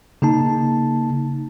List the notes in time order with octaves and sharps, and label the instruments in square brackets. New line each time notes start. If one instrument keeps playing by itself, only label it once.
[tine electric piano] C#3 A#3 D#4 A5